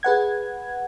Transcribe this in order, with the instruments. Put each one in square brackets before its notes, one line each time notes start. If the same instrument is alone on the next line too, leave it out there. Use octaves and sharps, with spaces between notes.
[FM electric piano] G#4 B4 F#5 G#6